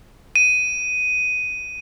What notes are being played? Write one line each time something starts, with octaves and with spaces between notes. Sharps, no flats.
D#7